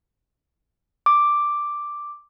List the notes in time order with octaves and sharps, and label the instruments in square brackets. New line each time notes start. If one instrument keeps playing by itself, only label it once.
[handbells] D6